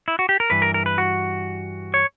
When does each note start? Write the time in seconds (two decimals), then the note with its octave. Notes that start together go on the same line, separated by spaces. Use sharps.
0.08 E4
0.19 F#4
0.29 G4
0.40 A#4
0.50 G2 E3 B4
0.62 A#4
0.74 A#4
0.86 B4
0.98 F#4
1.94 C#5